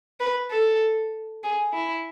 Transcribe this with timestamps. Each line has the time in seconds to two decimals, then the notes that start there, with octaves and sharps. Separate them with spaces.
0.20 B4
0.51 A4
1.43 G#4
1.73 E4